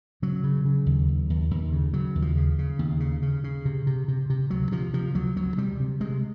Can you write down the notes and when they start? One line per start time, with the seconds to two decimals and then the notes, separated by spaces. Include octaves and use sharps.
0.22 C#3 F#3
0.44 C#3
0.65 C#3
0.86 D#2
1.08 D#2
1.30 D#2
1.51 D#2
1.72 C#3
1.93 C#3 F#3
2.15 D#2
2.22 F3
2.37 C#3
2.59 C#3
2.79 D#2
3.00 C#3
3.22 C#3
3.44 C#3
3.65 C3
3.87 C3
4.08 C3
4.30 C3
4.50 D2 F#3
4.72 C3 F3
4.94 C3 F3
5.15 D2 F#3
5.36 D2 F#3
5.58 C3 G3
5.80 C3
6.00 C3 G#3